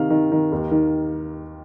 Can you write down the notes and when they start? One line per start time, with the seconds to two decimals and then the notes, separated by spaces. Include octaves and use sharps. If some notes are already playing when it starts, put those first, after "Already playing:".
Already playing: C3 D#3 F5
0.10 D#3
0.32 D#3
0.52 D#2
0.71 D#3